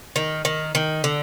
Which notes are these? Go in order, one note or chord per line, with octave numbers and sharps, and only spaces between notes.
D#3
D#3
D#3
D3